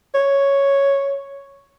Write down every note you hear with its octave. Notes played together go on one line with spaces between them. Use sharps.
C#5